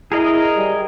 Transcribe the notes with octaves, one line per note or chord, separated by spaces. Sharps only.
E4 G#4 A#4 D#5
G3